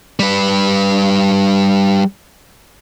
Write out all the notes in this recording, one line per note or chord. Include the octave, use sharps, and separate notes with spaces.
G3 B4